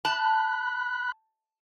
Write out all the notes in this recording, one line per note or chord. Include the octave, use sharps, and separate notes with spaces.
A5 B5 F#6